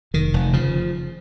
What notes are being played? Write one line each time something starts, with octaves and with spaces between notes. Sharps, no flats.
F1 D#3
F1
C#3 F3